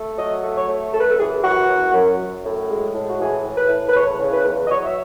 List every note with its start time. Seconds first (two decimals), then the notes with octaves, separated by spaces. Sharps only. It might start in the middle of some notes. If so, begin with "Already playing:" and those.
Already playing: A3
0.16 F#3 D#5
0.42 A3
0.55 C#5
0.67 A3
0.92 F#2 A4
1.00 B4
1.07 A4
1.17 E3 G#4
1.43 F#2 F#4
1.67 F#2
1.93 F#2
2.18 F#2
2.43 A2
2.68 G#3
2.93 A2
3.07 F#4
3.19 E3 G#4
3.43 A2
3.56 B4
3.68 A2
3.88 B4
3.93 E2 C#5
4.19 C#3
4.31 B4
4.44 E2
4.65 D#5
4.69 F#3 C#5
4.83 E5